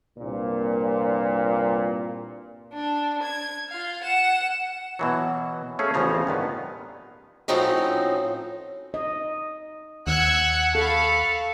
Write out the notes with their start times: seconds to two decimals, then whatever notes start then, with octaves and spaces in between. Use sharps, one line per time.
0.18 C2 G2 A#2
2.73 D4
3.22 G#6
3.69 F4 F5
4.02 F#5 E7
4.99 B2 E3 F#3
5.79 A3 C#4 G#4 A4 C#5 F5
5.94 A1 E2 C#3 F3 A#5
6.27 G2 D#3 B3
7.48 A2 F3 F#3 C4 C#4 D#4
8.94 D#5
10.07 D#2 F#5 E6 F#6 G#6
10.75 A4 F5 A5 B5 C#6